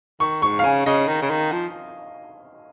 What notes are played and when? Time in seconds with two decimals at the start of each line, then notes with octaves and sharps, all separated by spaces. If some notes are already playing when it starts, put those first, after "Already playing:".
0.20 D#3 C#6
0.42 G#2 C#6
0.59 F5
0.64 C#3 G#5
0.86 C#3 D#5
1.08 D#3
1.22 C#3
1.30 D#3
1.52 F3